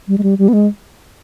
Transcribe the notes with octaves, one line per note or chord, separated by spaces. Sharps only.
G3
G#3
G3
G3
B3
G#3